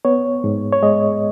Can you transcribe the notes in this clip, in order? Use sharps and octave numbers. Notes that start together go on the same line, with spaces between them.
B3 C#5
G#2
C#5
G#3 D#5